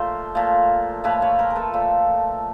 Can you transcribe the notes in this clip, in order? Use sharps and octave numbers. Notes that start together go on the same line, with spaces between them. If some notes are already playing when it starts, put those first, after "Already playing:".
Already playing: A#2 F3 A3 C5
A#2 F3 A3
A#2 F3 A3 B4 C#5
B4 C#5
A#4 C5
A#4
A4 B4
A#2 F3 A3